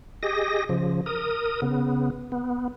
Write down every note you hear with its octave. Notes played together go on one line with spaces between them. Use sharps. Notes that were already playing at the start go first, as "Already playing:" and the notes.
G4 G#4 D#5 A#6
C#3 F3
A#4 D#6
C#3 B3
B3